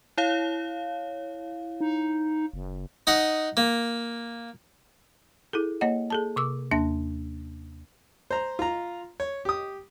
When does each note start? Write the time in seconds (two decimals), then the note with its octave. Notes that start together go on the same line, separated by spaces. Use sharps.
0.18 E4 C#5 F5
1.81 D#4
2.54 F#1
3.07 D#4 D#5 F#5
3.57 A#3
5.53 E4 G#4 A4
5.81 A#3 C#5 D#5 F#5
6.10 G#4 A4 A5
6.36 C3 D6 E6
6.71 D#2 A#3 D4 A5 A#6
8.31 C5 A#5
8.59 F4 A#5
9.20 C#5
9.45 G4 D#6